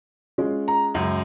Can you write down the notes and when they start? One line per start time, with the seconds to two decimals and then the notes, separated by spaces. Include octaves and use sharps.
0.38 G#3 C#4 F4
0.68 A#5
0.94 C#2 F#2